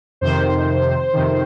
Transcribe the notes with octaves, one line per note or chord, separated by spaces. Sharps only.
F2 C3 D#3 C5
F2 C3 D#3